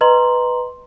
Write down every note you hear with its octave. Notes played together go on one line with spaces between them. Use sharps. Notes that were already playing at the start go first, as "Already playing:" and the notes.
B4 D#5 A#5 C6 F#7